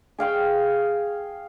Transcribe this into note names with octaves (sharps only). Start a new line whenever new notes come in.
G#4 F5 G5 C#6